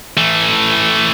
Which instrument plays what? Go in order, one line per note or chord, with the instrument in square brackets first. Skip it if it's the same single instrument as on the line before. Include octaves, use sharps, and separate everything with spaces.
[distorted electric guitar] E3 A3